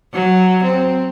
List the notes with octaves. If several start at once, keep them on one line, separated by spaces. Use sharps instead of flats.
F#3
C4